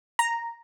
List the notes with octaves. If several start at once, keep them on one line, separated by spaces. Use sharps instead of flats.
A#5